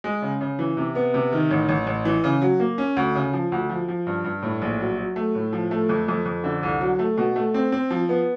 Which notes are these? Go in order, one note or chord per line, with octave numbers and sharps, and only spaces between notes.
G#3
C#3
C#3
E3
C3
B3
C3
D#3
A1
A1
A1
E3
C#3
F#3
A#3
C#4
D2
C#3
F3
D2
F3
F3
G2
G2
A2
A#1
F#3
F#3
A3
A2
F3
A3
F2
F2
F2
D3
C2
F#3
A3
B2
A3
C4
C4
F3
B3